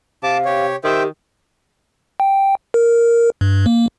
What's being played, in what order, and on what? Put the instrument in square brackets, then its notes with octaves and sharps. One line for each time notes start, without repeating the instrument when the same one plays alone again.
[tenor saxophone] C3 [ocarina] F5 [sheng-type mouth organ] A5 D6
[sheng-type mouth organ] G4 C#5
[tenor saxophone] D#3 [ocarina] G4 [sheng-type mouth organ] C5 E5 G5
[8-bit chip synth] G5
A#4
G2
A#3